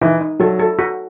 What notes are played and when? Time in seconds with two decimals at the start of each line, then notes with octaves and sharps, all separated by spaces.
0.01 E3 D#4
0.21 D#4
0.39 F#3 A4
0.59 A4
0.79 F#4